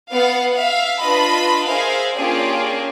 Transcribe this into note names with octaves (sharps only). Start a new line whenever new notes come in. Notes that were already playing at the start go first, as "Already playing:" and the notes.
B3 F5 F#5
E5 F5
D4 F4 B4 D#5 B5
G#4 A#4 C5 E5 F5
A#3 C#4 D4 F4 G4 G#4